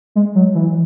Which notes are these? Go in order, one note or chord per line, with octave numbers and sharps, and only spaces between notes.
G#3
F#3
E3